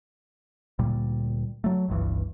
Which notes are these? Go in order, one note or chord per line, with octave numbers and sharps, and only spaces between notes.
D2 A#2 G3
F#3 A3
G1 C#2 G2 E3